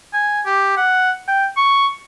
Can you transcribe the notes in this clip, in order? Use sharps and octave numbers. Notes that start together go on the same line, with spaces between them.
G#5
G4
F#5
G5
C#6